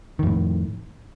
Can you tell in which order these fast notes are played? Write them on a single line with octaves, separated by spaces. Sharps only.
D#3 F2 A2